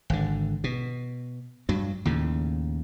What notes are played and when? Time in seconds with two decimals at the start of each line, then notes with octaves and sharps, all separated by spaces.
0.10 G#1 D3
0.64 B2
1.69 G2 F#3
2.05 D#2 A2 C#3